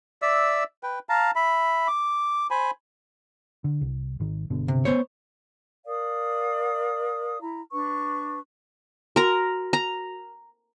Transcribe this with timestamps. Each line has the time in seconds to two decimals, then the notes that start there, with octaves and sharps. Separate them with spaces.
0.22 D5 E5 E6
0.83 B4 G5
1.09 F5 A5 A#5
1.36 E5 B5
1.88 D6
2.51 C5 G#5 B5
3.64 D3
3.81 C2
4.20 G#1 D#3
4.50 G1 B2 D3
4.68 C3
4.85 B3 C5 C#5
5.86 A#4 D5 F5 D#6
7.41 E4 A#5
7.72 D4 B4 C#6
9.16 F#4 A#4 A#5
9.73 A#5